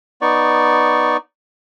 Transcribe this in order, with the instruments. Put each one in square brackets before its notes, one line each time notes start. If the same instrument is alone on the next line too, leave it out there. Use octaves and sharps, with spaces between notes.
[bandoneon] B3 D#4 D5 C#6